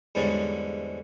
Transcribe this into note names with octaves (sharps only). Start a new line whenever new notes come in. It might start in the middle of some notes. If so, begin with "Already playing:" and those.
E2 G#2 D3 G3 C#4